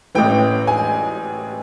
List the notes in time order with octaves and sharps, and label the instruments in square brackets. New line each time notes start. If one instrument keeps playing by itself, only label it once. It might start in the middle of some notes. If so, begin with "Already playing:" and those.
[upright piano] A1 A2 E3 G5
G#5